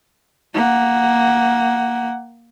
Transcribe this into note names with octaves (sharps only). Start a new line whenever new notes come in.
A#3 F#5